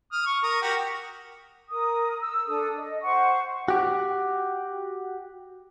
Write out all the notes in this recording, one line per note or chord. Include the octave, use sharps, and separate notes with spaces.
D#6 F6
C#6
A#4 D#6
F#4 G4 A#4
A#4 D#6
E6
D4 A4 D#6
D#5
C5 F#5 C#6
F#4 G4